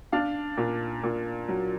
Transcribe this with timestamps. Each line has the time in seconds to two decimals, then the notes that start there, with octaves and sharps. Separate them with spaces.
0.12 D4 F5
0.57 A#2
1.03 A#2
1.48 F#3